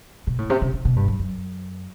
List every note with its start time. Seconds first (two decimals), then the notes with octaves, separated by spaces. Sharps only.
0.27 B2
0.38 A2
0.50 C3
0.62 C3
0.73 D3
0.85 B2
0.96 G2
1.08 F#2
1.19 F#2